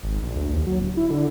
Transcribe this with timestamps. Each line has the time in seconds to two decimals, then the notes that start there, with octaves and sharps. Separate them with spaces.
0.03 G#1
0.23 A#1
0.36 D2
0.53 D#2
0.67 F#3
0.80 D1
0.97 E4
1.10 D3